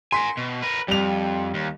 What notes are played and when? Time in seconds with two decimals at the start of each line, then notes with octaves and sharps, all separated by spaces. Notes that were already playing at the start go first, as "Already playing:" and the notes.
0.12 A#4 G#5 C6 B6
0.37 B2
0.62 A#4 B4
0.88 F2 G3 F7
1.54 D#2